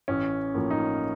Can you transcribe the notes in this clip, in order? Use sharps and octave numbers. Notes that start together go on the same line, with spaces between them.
A1 C#4
A2 F3 A#3
D#4